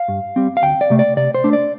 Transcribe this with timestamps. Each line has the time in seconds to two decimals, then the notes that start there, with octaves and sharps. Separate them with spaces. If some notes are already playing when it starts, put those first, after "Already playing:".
Already playing: F5
0.08 G2
0.36 G3 C4
0.57 F5
0.62 D2 G5
0.81 D5
0.90 C3 A3
0.99 D5
1.17 C3 D5
1.34 C5
1.44 A3 D4
1.53 D5